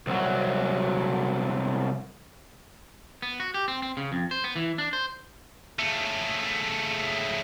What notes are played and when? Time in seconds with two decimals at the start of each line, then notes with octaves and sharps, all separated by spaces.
0.07 C2 F#3
3.22 B3
3.40 F#4
3.54 G4
3.68 C4
3.82 C4
3.97 C#3
4.12 F2
4.31 C5
4.44 B3
4.56 E3
4.78 D4
4.93 C5
5.79 C#3 A3